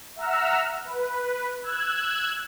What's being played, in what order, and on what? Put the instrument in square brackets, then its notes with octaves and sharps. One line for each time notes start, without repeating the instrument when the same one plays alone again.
[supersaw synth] E5 F#5 A#5 E6 F6
B4
E6 F#6 G#6